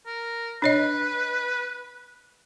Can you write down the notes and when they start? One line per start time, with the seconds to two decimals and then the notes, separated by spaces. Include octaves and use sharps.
0.06 A#4
0.62 D4 B4 C#5 D#5